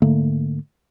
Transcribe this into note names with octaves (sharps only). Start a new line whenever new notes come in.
G#2 D3 A3 A#3